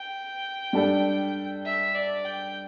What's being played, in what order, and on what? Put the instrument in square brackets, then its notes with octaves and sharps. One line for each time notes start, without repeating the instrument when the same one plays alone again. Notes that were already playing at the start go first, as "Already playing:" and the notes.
Already playing: [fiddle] G5
[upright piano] G3 D4 A4
[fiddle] E5
D5
G5